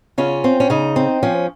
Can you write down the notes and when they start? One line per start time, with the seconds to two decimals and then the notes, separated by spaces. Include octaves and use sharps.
0.18 C#3 C#4 F4
0.44 C4
0.60 C#4
0.70 C#3 D#4
0.96 C4
1.23 F3 C#4